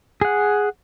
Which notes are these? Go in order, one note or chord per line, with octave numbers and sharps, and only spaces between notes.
G#4 F#5